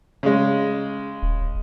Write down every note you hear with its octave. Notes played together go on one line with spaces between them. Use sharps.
C#3 G#3
D#1